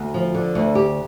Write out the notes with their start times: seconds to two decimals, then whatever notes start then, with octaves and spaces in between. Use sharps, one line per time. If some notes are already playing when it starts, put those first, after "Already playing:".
Already playing: D2
0.14 F3
0.34 D3
0.55 D2
0.75 G4